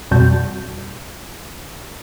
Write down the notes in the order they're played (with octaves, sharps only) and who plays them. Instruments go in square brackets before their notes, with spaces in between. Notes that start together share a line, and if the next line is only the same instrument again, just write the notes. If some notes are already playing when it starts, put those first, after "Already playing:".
[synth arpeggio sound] F2 B2 G3 F#4 A5 G6